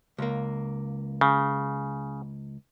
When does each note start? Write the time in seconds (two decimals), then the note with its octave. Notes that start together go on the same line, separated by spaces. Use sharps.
0.18 C#2 A#3
1.21 C#3